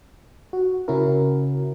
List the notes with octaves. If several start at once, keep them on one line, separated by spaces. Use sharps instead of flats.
F#4
C#3 C#4 E4 F#4 A#4